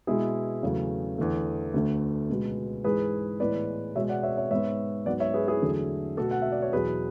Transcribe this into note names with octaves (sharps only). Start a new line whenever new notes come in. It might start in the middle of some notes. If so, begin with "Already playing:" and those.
B2 G#3 B3 E4 G#4
E2 C#3 F#3 A3
E2 D3 A3
D2 D3 A3
C#2 B2 G#3 B3
G#2 E3 G#3 G#4 B4
A2 E3 G#3 B3 B4 D5
B2 G#3 B3 C#5 E5
D5 F#5
C#5 E5
C#5 E5
G#2 G#3 B3 C#5 E5
G#2 F#3 B3 D5 F#5
C#5 E5
G#4 B4
E4 G#4
E2 D3 F#3 A3
B2 A3 F#4 A4
F#5
E5
D5
C#5
E2 B2 F#3 G#4 B4